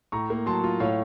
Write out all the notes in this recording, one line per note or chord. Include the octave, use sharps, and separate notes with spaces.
A2 A#5 C#6
A#3
F#3 A5 C6
F4
A2 C#5 F5